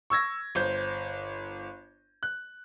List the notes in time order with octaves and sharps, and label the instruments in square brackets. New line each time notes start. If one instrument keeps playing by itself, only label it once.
[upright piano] C#6 E6 G#6 A#6
G1 C5 G6
F#6